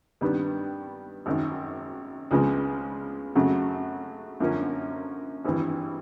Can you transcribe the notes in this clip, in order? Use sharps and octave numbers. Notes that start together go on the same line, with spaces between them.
G2 D#3 G3 B3
G#1 F#2 D#3
C#2 C#3 F3 G#3 B3
F#2 C#3 F#3 A3
F#2 D3 F3 A#3 C#4
G#1 G2 E3